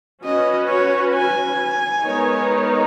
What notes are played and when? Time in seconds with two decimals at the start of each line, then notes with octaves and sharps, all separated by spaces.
0.24 C#4 F#4 B4 D#5
0.69 C#5
1.14 G#5
2.04 G#3 B3 D#4 A#4 C#5